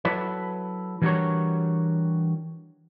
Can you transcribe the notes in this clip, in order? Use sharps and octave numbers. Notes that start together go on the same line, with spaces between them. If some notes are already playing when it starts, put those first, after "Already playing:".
F#3 E4 A4 B4
E3 G3 D4 F#4 A#4 C#5